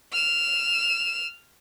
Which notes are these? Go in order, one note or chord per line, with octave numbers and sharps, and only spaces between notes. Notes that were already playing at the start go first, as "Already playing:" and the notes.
F6 E7